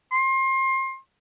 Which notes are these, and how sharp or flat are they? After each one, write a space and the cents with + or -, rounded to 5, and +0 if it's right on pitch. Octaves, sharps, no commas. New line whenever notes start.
C6 +30